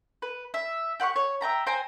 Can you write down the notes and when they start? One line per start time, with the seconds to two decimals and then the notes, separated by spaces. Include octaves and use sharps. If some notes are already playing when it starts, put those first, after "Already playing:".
0.22 B4
0.54 E5
1.00 G4 F#5 C6 C#6
1.16 C#5
1.41 E5 G5 A#5 B5
1.67 C5 G5 G#5 A#5